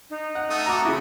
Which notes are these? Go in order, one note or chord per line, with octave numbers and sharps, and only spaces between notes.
D#4
F#5
A3 D#6
F#4 A#5 D6
C#3 E4